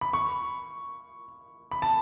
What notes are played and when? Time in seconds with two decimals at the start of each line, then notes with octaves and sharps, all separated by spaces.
0.01 B5
0.13 C#6
1.71 B5
1.82 A5